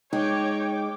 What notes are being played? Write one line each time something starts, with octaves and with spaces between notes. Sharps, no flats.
G#3 D#4 C#5 G5 D6